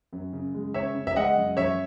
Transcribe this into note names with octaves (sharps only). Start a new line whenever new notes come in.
F#2
C#3
G#3
C#3 C#5 E5
C#3
E5
G#3 D#5 F#5
F#2
F#2 C#5 E5